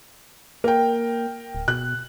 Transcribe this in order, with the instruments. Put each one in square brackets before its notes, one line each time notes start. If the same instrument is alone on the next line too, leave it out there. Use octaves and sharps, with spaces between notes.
[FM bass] A#3 [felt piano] A#4 G5
[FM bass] D1
[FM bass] B2 [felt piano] F#6